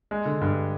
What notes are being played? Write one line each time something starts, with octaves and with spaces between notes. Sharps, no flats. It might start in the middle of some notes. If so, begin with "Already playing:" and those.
G#3
D3
G2